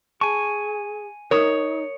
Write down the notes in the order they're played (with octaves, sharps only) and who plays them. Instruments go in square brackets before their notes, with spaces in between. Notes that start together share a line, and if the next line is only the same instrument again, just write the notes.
[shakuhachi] G#4 [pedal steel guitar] G#5 C#6 [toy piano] A5
[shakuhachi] D#4 [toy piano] A#4 A#5 D#6 [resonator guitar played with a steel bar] C#5